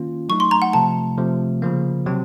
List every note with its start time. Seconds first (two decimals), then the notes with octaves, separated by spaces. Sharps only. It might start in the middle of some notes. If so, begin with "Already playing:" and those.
Already playing: D#3 A#3 C#4 F4
0.29 F#3 A3 D#4 C#6
0.40 C6
0.51 A#5
0.62 F#5
0.73 C3 F3 A3 A5
1.18 C3 F3 A3
1.62 C#3 F3 A#3
2.06 C3 F#3 C4